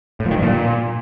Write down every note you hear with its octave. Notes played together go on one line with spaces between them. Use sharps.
A2
F3
D#3
G2
A#2